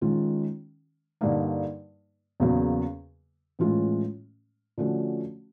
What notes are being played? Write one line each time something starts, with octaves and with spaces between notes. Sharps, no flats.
D#3 G#3 C#4 F4
G2 D3 G3 A#3 D#4
E2 C#3 F#3 A#3
A2 E3 G#3 C#4 F4
D3 F3 A3 C#4 F#4